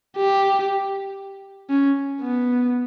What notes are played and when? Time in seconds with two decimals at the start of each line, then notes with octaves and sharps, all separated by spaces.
0.17 G4
1.70 C#4
2.22 B3